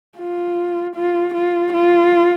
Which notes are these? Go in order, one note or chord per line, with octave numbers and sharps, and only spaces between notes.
F4
F4
F4
F4